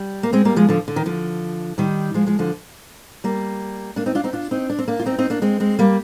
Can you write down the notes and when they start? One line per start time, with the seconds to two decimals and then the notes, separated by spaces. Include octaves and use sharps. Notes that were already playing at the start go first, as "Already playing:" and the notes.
Already playing: G3
0.23 A#3
0.33 G#3 C4
0.45 G3 A#3
0.56 F3 G#3
0.69 D3 F3
0.88 D3
0.96 D#3
1.06 D3 F3
1.78 D#3 G3
2.14 F3 G#3
2.26 F3 G#3
2.39 D3 F3
3.24 G3 A#3
3.96 A#3 D4
4.06 C4 D#4
4.15 D4 F4
4.24 C4 D#4
4.33 D4 F4
4.51 C4 D#4
4.70 D4
4.79 C4
4.88 A#3 D4
5.00 F4
5.06 C4 D#4
5.18 C4 D#4
5.30 A#3 D4
5.42 G#3 C4
5.60 G#3 C4
5.79 G3 A#3